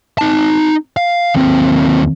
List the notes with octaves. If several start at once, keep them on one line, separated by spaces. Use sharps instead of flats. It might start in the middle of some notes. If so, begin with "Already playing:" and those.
D#4 A5
F5
D#2 C4